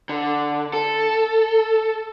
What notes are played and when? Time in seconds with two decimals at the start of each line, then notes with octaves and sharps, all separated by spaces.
0.09 D3
0.73 A4